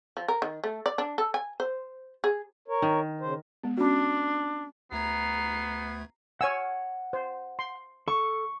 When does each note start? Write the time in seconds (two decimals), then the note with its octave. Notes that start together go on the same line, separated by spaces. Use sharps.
0.17 F3
0.28 A#4
0.42 D#3
0.64 A3
0.86 D5
0.98 D4
1.18 A4
1.34 G#5
1.60 C5
2.24 G#4
2.68 A#4 C#5
2.82 D#3
3.21 C#3 C5
3.64 G#3 B3
3.77 C#4 D4 F#4
4.92 D2 A3 B3 A#5 G#6 C7
6.41 C#5 F#5 G#5 E6 F6
7.13 C5
7.59 C6
8.08 A4 C#6